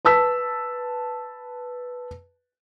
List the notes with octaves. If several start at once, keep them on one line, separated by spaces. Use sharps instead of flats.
B4 A5 E6 B6